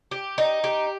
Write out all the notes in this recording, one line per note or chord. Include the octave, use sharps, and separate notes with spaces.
G4
D#4
G4